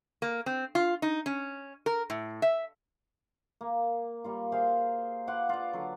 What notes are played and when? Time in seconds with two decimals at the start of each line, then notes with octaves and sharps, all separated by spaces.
0.22 A#3
0.46 C4
0.75 F4
1.02 D#4
1.26 C#4
1.86 A#4
2.10 A2
2.42 E5
3.61 A#3
4.24 G3 A#3 F4
4.52 G#4 C5 E5 F5
5.27 F4 B4 F#5 D6
5.49 F4 D5
5.73 D3 F#3